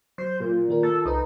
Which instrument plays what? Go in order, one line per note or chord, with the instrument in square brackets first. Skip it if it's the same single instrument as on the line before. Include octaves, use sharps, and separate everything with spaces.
[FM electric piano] F#3 [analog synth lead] C5
[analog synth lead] A#2
[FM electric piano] D#3 F4 A#4
[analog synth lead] A4
[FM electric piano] C2 A4 B4 [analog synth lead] D#4